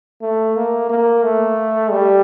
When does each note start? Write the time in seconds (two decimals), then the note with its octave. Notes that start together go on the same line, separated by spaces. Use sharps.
0.22 A3
0.56 A#3
0.90 A#3
1.23 A3
1.91 G3